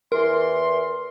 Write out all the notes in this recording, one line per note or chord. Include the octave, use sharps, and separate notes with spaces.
E2 E3 A#4 C6